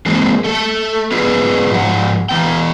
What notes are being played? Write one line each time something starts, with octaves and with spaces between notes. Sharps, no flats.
E3 G#3 A#3 C4
A3 A4
B3 F4 G#4 B4
G#2 F3 F#5
E3 F3 B3 G5